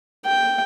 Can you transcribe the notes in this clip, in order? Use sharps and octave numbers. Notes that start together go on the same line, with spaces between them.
G5